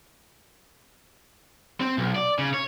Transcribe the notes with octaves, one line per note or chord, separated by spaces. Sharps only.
C4
B1
D5
C#3
C#5